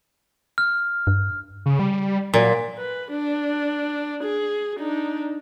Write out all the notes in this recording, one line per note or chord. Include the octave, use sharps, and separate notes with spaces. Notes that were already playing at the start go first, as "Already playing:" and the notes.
F6
G2
C#3
G3
A#2 F#3
B4
D4
G#4
D4 D#4